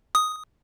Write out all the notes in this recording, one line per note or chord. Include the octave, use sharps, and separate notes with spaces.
D#6